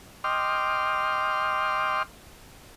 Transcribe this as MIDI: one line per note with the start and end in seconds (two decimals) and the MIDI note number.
0.24 2.03 75
0.24 2.03 79
0.24 2.03 84
0.24 2.03 86
0.24 2.03 89